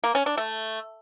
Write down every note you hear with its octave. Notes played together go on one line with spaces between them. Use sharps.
A#3
C#4
D4
A3